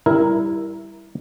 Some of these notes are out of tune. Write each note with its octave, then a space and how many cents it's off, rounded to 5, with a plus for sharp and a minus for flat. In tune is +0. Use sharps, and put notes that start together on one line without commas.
G3 +0 E4 +0 A#4 +5